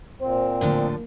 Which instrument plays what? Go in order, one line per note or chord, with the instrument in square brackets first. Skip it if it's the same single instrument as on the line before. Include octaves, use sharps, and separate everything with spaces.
[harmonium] A#2 C4 [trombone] C5
[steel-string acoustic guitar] A2 D3 F3 [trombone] A#3